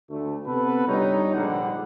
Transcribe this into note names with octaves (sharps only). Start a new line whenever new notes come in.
D2 A3
C3 B3 A4 B4
G1 G3 D#4 C#5 A#5
A#1 G#2 D3 G3 F#5